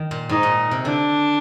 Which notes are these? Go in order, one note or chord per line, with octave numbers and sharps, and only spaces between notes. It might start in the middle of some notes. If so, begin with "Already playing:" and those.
Already playing: D#3
A#2
G#2 D#4
A#2
C3
D3 D4